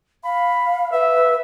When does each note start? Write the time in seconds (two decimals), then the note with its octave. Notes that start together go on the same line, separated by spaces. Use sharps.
0.24 F5 B5
0.92 B4 E5